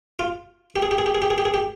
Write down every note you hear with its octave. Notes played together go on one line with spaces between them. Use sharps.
F4
G4
G#4
G4
G#4
G4
G#4
G4
G#4
G4
G#4
G4